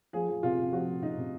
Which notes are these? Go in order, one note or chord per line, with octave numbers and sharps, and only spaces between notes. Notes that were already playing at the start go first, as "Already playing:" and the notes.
F3 G#4
F3
C3 F4
C3
F3 F#4
F3
C3 D#4
C3